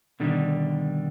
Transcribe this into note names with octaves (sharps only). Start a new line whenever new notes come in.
B2 D3 D#3 G3